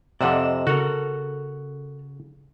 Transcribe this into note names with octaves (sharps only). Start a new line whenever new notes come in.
F2 C3 D5 D#5 F#5 E7
C#3 F#4 A4 A#4